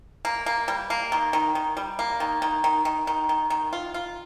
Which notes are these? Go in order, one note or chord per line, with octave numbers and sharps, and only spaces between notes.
A#3
A#3
G3
A#3
D#3
D#3
D#3
G3
A#3
D#3
D#3
D#3
D#3
D#3
D#3
D#3
F4
F4